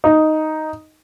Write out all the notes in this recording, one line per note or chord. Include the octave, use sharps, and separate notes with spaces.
D#4